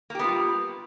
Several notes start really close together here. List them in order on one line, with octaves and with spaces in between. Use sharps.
A#3 G4 B3 F4 G3